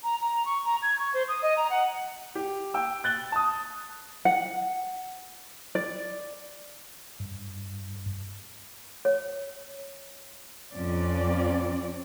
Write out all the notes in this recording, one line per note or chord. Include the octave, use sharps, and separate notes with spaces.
A#5
A#5
C#6
A#5
G#6
C#6
C5
D#6
D#5
A#5
F#5
G4
G5 E6
F#6 A6 G7
A5 D#6
F#5
D5
G2
C#5
F2 C4 C#4 D5